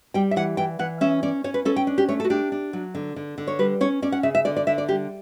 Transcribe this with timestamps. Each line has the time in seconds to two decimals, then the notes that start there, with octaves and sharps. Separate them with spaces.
0.14 G3 G5
0.31 E5
0.36 E3 F#5
0.57 E3 G5
0.79 E3 F#5
1.01 C#4 E5
1.23 C#4 D5
1.44 C#4 C#5
1.54 B4
1.65 C#4 A4
1.76 G5
1.87 D4
1.98 G4
2.09 A3 C#5
2.20 A4
2.25 F#4
2.30 D4 G4
2.52 D4
2.73 F#3
2.95 D3
3.16 D3
3.38 D3
3.48 C#5
3.59 G3 B4
3.81 C#4 C#5
4.02 C#4 D5
4.12 F#5
4.23 C#3 E5
4.35 E5
4.45 D3 D5
4.57 D5
4.67 D3 E5
4.78 D5
4.88 G3 G4